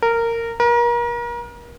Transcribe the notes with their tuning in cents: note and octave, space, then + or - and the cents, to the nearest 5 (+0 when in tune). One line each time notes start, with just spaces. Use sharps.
A#4 -15
A#4 +35